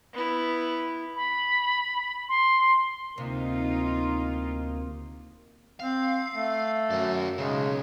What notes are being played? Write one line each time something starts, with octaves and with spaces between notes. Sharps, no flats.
B3 E4
B5
C6
D2 C3 A#3 D#4 F4
C4 F5
A3
F#2 F#4 D5
B1 C#3 G#3